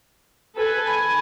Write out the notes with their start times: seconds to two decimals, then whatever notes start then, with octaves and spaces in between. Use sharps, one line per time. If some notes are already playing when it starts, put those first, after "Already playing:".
0.55 A4 B4 G#5
0.87 G#5 B5